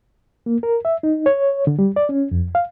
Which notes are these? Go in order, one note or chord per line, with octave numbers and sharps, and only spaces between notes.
A#3
A#4
E5
D#4
C#5
D3
G3
D5
C#4
F2
F5